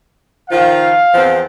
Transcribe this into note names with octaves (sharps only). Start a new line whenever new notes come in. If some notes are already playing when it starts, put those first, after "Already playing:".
D#3 F3 F4 F5
E2 F3 C4